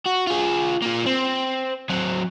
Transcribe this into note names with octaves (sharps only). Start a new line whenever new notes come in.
F#4
F4 G#4
A#3 F4
C4
F#3 C4